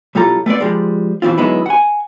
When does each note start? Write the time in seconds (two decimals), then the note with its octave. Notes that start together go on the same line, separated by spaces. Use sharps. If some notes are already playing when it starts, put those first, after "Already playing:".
0.15 B1 G3 E4 F4 A4 A#5
0.46 A3 B3 C4 D5
0.60 F3 G3 G#3
1.22 B2 E3 F3 C4 F4
1.38 D3 F#3 G#3 B3 D#4 E4
1.66 F#5 G#5